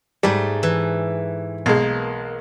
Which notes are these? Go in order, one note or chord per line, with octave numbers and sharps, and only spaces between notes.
G#2 G3 A3
E3
B1 G#3 A#3